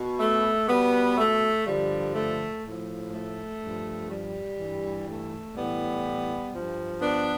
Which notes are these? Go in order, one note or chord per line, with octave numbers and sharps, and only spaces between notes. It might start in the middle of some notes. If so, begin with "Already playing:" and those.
Already playing: B2
A3
B2 G3 B3
A3
G2 D3 F3 G3
A3
A2 F3
A3
G2 F3
G3
G2 E3
A3
A2 E3 G3 B3
G2 F3
B3 D4